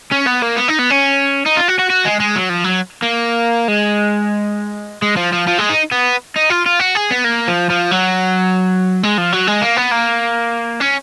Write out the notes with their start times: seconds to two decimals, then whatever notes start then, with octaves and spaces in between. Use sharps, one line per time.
0.12 C#4
0.27 B3
0.42 A#3
0.57 B3
0.68 D#4
0.79 B3
0.90 C#4
1.46 D#4
1.57 F4
1.69 F#4
1.79 F#4
1.90 F#4
2.05 G#3
2.20 G#3
2.36 F#3
2.49 F3
2.64 F#3
3.02 A#3
3.68 G#3
5.02 G#3
5.17 F3
5.32 F3
5.47 F3
5.58 G#3
5.70 D#4
5.92 B3
6.36 D#4
6.50 F4
6.66 F4
6.80 F#4
6.95 G#4
7.11 B3
7.24 A#3
7.48 F3
7.70 F3
7.92 F#3
9.03 G#3
9.18 F3
9.33 F#3
9.47 G#3
9.62 A#3
9.77 B3
9.92 A#3
10.81 C#4